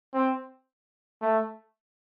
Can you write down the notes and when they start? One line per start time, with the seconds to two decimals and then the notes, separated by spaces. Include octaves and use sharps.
0.14 C4
1.21 A3